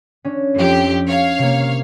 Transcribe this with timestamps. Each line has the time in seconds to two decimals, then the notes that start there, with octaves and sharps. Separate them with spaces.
0.25 C#4 D4
0.54 F2 G4
1.07 C#5 F5
1.39 C3 A#3